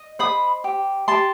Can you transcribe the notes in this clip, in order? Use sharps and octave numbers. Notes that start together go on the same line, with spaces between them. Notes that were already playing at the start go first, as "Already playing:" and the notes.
Already playing: D#5
C5 B5 D#6
G4
G4 A5 C6